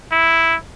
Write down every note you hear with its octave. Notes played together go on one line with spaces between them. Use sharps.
E4